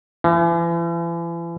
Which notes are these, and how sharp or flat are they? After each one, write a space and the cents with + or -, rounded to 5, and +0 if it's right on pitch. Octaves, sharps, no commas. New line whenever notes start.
E3 +40